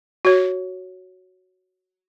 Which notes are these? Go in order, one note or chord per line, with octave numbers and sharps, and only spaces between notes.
F#4 C#5